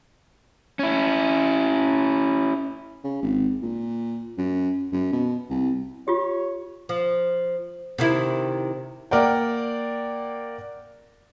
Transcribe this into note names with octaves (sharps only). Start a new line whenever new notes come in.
C#4 E4
C#3
G#1
A#2
F#2
F#2
B2
C2
F4 G4 C#5
F3
C3 D#3 E4
A#3 A#4 D5 F#5 G5